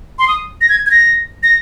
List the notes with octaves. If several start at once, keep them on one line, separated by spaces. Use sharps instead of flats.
C6
D#6
A#6
G#6
G#6
A#6
A#6